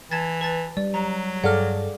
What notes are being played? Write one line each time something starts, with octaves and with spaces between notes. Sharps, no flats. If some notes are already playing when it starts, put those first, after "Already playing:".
E3 A5 G#6 A6
B4 A5 A6
G3 D5
F#3 A#5
G2 G#4 A4 D5 F5 F#5 F6